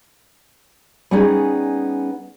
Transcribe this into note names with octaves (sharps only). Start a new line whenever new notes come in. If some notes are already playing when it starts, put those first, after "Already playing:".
G3 B3 C#4 D#4 G#4